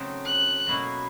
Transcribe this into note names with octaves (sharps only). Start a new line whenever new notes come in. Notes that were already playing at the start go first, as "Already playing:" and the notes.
Already playing: C#3 F#3 A3 C4 D#4
F#6
B2 F#3 A#3 C#4 E4